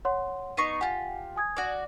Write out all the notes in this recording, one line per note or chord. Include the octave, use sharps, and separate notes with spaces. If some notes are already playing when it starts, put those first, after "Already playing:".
C#5 F#5 C6
B3 D#4 D#5 C#6 C7 D#7
F4 G4 F#5 G#5
G#5 D#6 G#6
F#4 D5